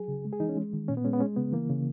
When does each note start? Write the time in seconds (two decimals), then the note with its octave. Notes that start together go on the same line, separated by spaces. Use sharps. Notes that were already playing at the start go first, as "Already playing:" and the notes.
Already playing: F#3 G#4
0.08 C#3
0.25 G#3
0.33 G#4
0.40 E3 D#4
0.49 C#4
0.57 G#3
0.73 D#3
0.88 A#2 C#4
0.97 B3
1.05 G#3 C#4
1.13 B3
1.20 G#3 C#4
1.36 C#3 B3
1.52 E3 A#3
1.69 C#3